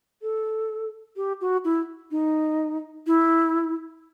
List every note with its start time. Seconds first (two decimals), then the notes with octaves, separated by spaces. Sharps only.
0.22 A4
1.16 G4
1.41 F#4
1.65 E4
2.11 D#4
3.07 E4